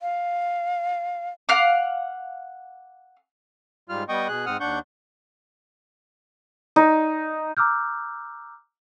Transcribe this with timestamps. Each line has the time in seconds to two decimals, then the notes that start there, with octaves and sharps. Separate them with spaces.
0.01 F5
1.49 F5 F#5 D6
3.89 G#2 G3 F4 F6
4.09 G3 B3 D#5 G5 C#6 D#6
4.28 B2 G#4 F#6
4.46 G#2 C4 F#5 D#6 F6
4.60 D#2 D4 F#5 C#6 G6
6.76 D#4
7.57 A#5 D6 E6 F6 G6